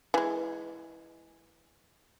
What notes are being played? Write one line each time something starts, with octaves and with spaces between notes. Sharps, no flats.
E3 G#3